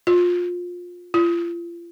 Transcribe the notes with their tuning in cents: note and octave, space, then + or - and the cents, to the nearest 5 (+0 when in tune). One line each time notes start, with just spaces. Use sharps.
F4 +20
F4 -35